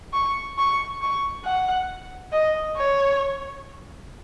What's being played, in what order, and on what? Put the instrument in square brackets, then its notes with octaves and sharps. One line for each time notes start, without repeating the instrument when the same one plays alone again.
[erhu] C#6
C#6
C#6
F#5
D#5
C#5